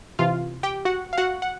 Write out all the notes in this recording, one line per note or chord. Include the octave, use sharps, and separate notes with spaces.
C3 E3 F4 F5
G4 G5
F#4 F#5
F5
F#4 F#5
F#5